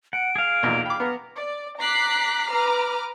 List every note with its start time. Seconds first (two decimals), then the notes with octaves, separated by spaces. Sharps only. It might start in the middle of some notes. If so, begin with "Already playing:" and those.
0.13 F#5 D7
0.36 G#4 F5
0.63 B1 E2 A#2
0.86 G5 B5 D6
1.00 B3 A#5
1.36 D5
1.81 A#5 D6 F#6 B6 C7
2.51 B4 A#5 D6 F6